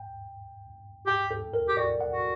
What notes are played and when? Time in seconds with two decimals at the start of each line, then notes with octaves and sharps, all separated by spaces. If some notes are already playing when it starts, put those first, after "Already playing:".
Already playing: G5
1.07 G4 G5
1.31 A4
1.54 A#4
1.68 G4
1.77 F#4 D5
2.01 F#5
2.12 F#4